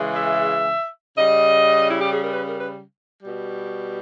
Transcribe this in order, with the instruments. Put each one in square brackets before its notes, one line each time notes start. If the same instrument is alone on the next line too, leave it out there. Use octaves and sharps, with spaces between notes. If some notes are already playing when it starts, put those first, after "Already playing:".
Already playing: [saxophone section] C#3 E3 G#3
E5
C#3 G3 D#5
E4
G4
G#4
A#4
B4
A#4
B4
B2 G3